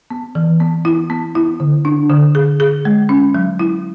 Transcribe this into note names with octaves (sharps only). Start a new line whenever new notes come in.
B3
E3
B3
E4
B3
E4
D3
D4
D3
G#4
G#4
G#3
C#4
F#3
E4